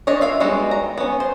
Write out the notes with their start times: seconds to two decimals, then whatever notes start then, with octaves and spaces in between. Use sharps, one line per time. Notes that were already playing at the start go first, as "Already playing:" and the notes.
0.07 D4 C#5 D#5
0.21 F4 E5 F5
0.40 G3 G#3 B3 F#4
0.71 A#5
0.98 B3 C#4
1.20 C5